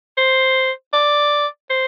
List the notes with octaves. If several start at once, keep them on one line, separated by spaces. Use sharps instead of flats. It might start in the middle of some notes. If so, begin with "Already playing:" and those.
C5
D5
C5